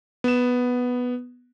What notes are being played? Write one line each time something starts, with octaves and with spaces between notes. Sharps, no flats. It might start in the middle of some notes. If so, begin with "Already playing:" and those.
B3 E7